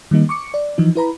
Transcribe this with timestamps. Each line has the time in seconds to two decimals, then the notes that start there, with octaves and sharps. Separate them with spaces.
0.11 D#3 G3 A#3 D#4
0.29 C#6 D6 C#7
0.54 D5
0.78 E3 F3 D#4
0.95 E4 B4 A#5 B5